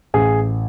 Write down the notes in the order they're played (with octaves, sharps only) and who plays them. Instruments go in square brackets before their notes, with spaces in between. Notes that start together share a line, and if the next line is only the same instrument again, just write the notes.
[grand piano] A1 G#4